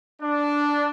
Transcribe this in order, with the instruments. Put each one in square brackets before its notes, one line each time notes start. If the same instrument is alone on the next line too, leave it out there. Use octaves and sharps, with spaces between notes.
[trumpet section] D4